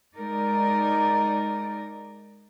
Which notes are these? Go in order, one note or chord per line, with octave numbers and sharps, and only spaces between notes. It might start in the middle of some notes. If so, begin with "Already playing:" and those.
G#3 D#4 A#4 D5